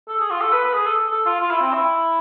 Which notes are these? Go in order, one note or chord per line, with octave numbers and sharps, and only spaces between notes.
A4
G#4
F4
A4
B4
B4
G#4
A4
A4
F4
F4
E4
C4
E4